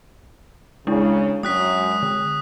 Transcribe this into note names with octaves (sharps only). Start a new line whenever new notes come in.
C#3 G#3 D4 E4
F#2 G#3 D#6 F#6 B6
D3